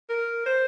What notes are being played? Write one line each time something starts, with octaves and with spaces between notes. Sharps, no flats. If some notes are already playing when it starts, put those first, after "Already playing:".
A#4
C5